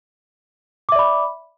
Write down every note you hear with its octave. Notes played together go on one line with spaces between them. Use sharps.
D5 E5 B5 D6